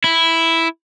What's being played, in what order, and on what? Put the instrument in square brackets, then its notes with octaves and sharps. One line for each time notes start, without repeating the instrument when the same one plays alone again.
[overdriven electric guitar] E4